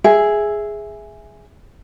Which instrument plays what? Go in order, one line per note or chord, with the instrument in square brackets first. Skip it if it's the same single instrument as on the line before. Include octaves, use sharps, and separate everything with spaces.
[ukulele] G#4 E5